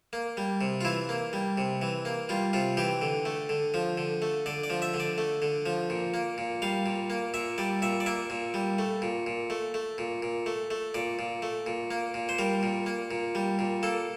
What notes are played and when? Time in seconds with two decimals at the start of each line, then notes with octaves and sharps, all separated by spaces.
0.13 A#3
0.37 G3
0.61 C3
0.81 F4
0.85 E3 E4
1.09 A#3
1.33 G3
1.58 C3
1.82 E3
2.05 A#3
2.29 G3 F4
2.53 C3 F4
2.77 E3 G4
3.02 D3
3.25 A3
3.49 D3
3.74 F3
3.98 D3
4.22 A3
4.46 D3 D5
4.64 D5
4.70 F3
4.82 E5
4.94 D3
5.00 D5
5.18 A3
5.42 D3
5.66 F3
5.90 A#2
6.14 A#3
6.38 A#2
6.62 G3 F5
6.86 A#2
7.10 A#3
7.34 A#2 E5
7.58 G3 D5
7.82 A#2 E5
8.00 D5
8.06 A#3 E5
8.30 A#2
8.54 G3
8.79 A3
9.02 A#2
9.27 A#2
9.50 A3
9.74 A3
9.98 A#2
10.22 A#2
10.46 A3
10.71 A3
10.94 A#2 D5
11.19 A#2
11.42 A3
11.66 A#2
11.91 A#3
12.14 A#2
12.29 C5
12.39 G3 A#4
12.63 A#2
12.86 A#3
13.11 A#2
13.35 G3
13.59 A#2
13.83 A#3 A4